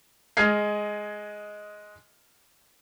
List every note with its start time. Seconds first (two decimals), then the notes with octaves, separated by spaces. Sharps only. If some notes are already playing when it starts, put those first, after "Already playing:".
0.37 G#3 D#5 F6 G#6 C7